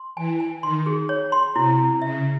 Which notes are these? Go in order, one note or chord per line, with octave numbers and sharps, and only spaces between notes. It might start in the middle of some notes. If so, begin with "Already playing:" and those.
Already playing: C6
E3 G#5
G#5
D#3 C6
G#4
C#5
C6
C3 E4
E4
C#3 E5